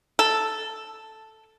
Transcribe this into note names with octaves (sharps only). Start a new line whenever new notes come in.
A4